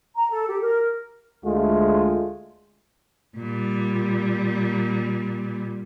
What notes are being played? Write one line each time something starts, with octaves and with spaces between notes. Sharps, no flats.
A#5
A4
G4
A#4
D2 G#3 A3 F4
A#2 G3